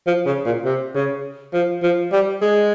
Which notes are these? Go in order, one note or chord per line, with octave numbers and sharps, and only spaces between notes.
F3
C#3
A#2
C3
C#3
F3
F3
G3
G#3